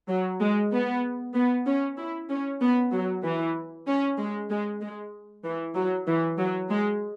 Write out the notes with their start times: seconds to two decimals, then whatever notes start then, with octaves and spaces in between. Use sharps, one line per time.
0.08 F#3
0.40 G#3
0.72 B3
1.34 B3
1.66 C#4
1.97 E4
2.29 C#4
2.61 B3
2.92 F#3
3.23 E3
3.87 C#4
4.18 G#3
4.50 G#3
4.81 G#3
5.44 E3
5.75 F#3
6.07 E3
6.38 F#3
6.70 G#3